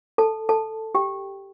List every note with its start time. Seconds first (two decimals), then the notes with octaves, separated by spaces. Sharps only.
0.18 A4 A5
0.49 A4 A5
0.95 G4 G5